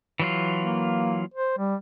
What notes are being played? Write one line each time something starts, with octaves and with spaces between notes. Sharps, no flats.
E3 F#3 F4
A#3
C5
G3